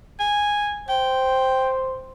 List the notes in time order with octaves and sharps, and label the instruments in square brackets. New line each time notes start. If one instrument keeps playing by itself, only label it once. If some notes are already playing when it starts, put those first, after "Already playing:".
[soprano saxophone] G#5
[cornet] C5 [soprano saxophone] G5